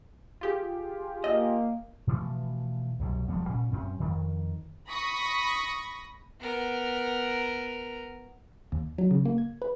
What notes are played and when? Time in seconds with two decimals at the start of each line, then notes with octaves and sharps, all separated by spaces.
0.41 F4 G4 G#4
1.24 A#3 D#5
2.07 B2 E3 F3 A3
2.99 C2 F#2 B2
3.28 E1 F3 G3 B3
3.49 A#2 C#4
3.72 F#2 C4 C#4
4.00 F2 D#3
4.88 B5 C#6 D#6 A#6
6.40 B3 A#4
8.72 D#2
8.98 F#3
9.11 C#3
9.25 A#3
9.38 G#6
9.62 B4